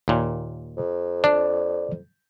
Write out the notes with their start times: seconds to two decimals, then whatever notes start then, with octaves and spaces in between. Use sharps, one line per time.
0.08 D#2 A#2
0.77 F2
1.24 D4 D5